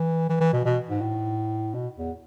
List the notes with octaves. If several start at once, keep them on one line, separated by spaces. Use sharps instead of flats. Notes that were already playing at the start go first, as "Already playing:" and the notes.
Already playing: E3
E3
E3
B2
B2
G#2
A2
B2
E2